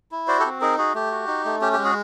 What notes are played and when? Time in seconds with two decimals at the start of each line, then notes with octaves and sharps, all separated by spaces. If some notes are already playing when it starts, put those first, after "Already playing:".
0.12 E4
0.28 F#4 C5 D5
0.39 G4 A4
0.45 C4
0.61 D#4 G#4 A#4
0.78 F#4 G#4
0.94 A3 G4
1.11 F#4
1.28 D#4
1.45 A3
1.61 C#4 G4
1.73 G#3 G4
1.84 F#4 G#4